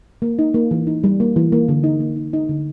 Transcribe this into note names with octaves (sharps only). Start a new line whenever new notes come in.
A#3
D#4
A#3
E3
D#4
G3
A#3
E3
A#3
D3
D#4
A#3
D#4
D#4
D3